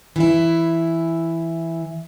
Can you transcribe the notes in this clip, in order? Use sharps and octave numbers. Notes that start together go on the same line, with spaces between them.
E3 E4